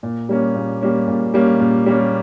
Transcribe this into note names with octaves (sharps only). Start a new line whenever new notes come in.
A#2
G3 A#3 C#4
A#2
G3 A#3 C#4
A#2
G3 A#3 C#4
A#2
G3 A#3 C#4